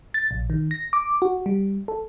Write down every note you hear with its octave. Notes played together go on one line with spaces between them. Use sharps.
A6
A#1
D#3
A#6
D6
F#4
G3
A4